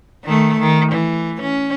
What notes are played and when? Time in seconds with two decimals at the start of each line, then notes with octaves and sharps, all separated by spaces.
0.24 D#3 A3
0.60 D#3
0.91 E3
1.41 C#4